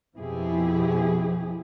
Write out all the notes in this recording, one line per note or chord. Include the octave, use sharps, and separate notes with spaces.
F2 B2 F3 E4 G4 G#4